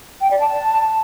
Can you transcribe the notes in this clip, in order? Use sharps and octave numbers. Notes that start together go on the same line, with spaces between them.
G5
D5
A5